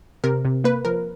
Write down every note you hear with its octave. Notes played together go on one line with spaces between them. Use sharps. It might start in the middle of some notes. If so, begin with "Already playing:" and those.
C3 A#4
C3
A#3 B4
F3 A#4